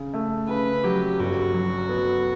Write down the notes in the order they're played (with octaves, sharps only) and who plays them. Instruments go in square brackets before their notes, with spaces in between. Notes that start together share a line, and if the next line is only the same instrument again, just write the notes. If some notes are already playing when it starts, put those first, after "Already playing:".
Already playing: [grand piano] C#3
A3
[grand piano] C#3 [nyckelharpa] B4
[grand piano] F#3 [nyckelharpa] G4
[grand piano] G1 [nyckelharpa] F#4
[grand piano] F#3
B3